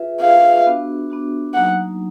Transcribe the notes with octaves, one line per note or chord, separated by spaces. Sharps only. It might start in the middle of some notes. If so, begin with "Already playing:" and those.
Already playing: F4 G#4 B4 E5
F4 G#4 B4 E5 F5
B3 D4 F#4
B3 D4 F#4
F#3 A#3 D#4 F#5